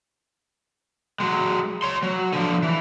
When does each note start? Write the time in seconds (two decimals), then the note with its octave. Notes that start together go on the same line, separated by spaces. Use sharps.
1.20 F#3 G#3
1.83 C#5 C6
2.03 F#3
2.33 D3 F3
2.63 E3